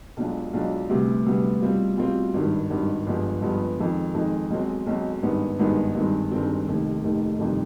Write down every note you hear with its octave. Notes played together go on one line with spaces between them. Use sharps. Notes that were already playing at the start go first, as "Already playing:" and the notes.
B1 B2 G#3 D4 F4
B1 B2 G#3 D4 F4
D2 C3 G3 B3
D2 C3 G3 B3
B2 G3 C4 F4
B2 G3 C4 F4
G#1 G2 D#3
G#1 G2 D#3
G1 G2 F3 G#3 B3
G1 G2 F3 G#3 B3
F2 D#3 G#3
F2 D#3 G#3
B1 B2 G#3 C4
B1 B2 G#3 C4
G#1 G2 D#3 G#3 B3
G#1 G2 D#3 G#3 B3
G1 G2 D#3 G#3 C4
G1 G2 D#3 G#3 C4
F1 D#2 D#3
F1 D#2 D#3
G1 F2 C3 D#3